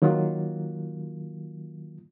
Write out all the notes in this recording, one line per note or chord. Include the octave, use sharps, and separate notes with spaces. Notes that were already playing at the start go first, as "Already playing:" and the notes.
D#3 F#3 A#3 F4